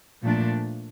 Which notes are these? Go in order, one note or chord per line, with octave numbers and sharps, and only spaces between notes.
A#2 F3 A3 D4